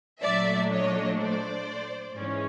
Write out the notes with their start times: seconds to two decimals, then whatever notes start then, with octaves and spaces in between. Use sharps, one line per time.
0.23 A#2 F#3 A3 D4 D5 E5
0.71 C#5 D#5
1.19 C5 D5
2.15 G#2 E3 G#3 C#4